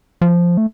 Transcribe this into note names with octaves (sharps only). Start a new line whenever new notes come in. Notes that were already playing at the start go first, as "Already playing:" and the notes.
F3
A3